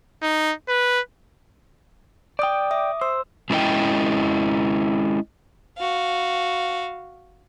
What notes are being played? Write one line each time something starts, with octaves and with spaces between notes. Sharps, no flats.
D#4
B4
D5 G5 D#6 G6
E5 D6 D#6
C5 E6
G#3 C#4 E4 G#4 D#5 G5
F#4 F5